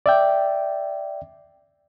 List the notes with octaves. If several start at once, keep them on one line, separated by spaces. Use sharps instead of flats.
D5 E5 G5